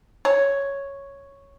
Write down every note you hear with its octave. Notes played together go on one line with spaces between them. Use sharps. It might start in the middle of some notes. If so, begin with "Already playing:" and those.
C#5